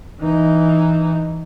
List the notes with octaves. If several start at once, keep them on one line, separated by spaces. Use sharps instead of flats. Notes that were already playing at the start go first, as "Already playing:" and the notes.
E3 D#4